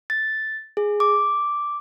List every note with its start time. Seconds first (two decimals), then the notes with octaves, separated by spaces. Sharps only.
0.10 A6
0.77 G#4
1.00 D6